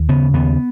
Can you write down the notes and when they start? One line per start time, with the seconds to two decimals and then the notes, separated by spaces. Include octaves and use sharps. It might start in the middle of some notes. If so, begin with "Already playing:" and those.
Already playing: D#2
0.09 C#3 B3
0.34 D#2 B3